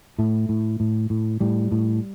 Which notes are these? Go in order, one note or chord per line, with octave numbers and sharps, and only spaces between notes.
A2 A3
A2
A2
A2
A2 G3
A2